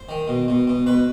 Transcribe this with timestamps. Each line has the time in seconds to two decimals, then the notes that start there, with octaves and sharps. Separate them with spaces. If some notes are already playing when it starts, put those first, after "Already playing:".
Already playing: C5
0.09 D#3
0.28 B2
0.48 B2
0.67 B2
0.86 B2 B4